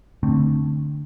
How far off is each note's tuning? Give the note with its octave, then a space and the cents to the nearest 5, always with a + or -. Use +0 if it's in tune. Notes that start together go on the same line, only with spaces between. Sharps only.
D3 +0 A3 +5 C4 +0